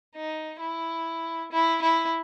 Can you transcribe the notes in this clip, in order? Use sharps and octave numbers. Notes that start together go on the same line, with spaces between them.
D#4
E4
E4
E4